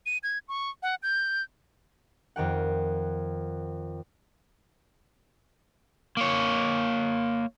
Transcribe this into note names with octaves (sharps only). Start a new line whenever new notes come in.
D#7
G#6
C#6
F#5
G6
F2 D#3 G4 F#5
A#3 C#5